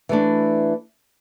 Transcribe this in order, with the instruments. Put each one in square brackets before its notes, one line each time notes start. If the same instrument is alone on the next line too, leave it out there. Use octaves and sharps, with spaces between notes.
[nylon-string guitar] E3 A3 D4